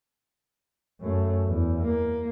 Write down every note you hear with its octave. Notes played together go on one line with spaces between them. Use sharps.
F#2 A3
E2
A#3